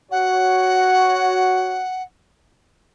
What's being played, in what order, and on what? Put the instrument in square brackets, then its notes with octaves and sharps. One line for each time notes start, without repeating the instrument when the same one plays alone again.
[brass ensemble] F#4 C#5 [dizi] F#5